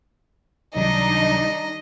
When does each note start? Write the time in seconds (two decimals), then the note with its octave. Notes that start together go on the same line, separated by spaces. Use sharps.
0.75 C#2 C3 D#3 F#3 G3 D4 D#4 D#5